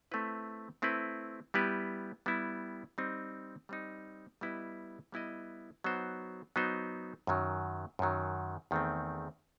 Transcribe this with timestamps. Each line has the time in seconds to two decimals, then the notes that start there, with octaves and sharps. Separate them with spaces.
0.11 A3 C4 E4 B4
0.82 A3 C4 E4 B4
1.54 G3 B3 E4 G4 B4
2.26 G3 B3 E4 G4 B4
2.98 G3 C4 D#4
3.69 G3 C4 D#4
4.41 G3 B3 E4 B4 D#5
5.12 G3 B3 E4 B4 D#5
5.84 F#3 B3 D#4 F#4 C5
6.56 F#3 B3 D#4 F#4 C5
7.27 F#2 D#3 F#3
7.99 F#2 D#3 F#3
8.71 E2 D#3 A3 C4